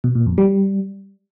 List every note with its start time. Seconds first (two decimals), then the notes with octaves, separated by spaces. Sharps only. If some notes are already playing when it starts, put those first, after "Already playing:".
0.04 B2
0.15 A#2
0.26 F2
0.38 G3